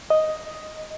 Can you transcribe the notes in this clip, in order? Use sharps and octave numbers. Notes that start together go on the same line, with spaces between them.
D#5